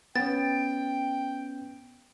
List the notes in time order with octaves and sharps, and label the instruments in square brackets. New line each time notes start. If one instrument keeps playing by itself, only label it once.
[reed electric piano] B3 C#4 [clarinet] G5 [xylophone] A6